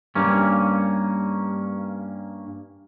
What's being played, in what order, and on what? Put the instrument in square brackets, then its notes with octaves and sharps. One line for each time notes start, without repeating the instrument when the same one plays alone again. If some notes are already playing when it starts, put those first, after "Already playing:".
[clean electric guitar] G2 A#3 C#4